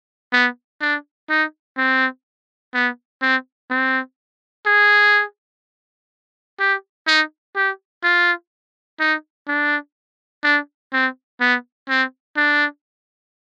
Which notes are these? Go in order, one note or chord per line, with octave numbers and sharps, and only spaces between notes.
B3
D4
D#4
C4
B3
C4
C4
G#4
G4
D#4
G4
F4
D#4
D4
D4
C4
B3
C4
D4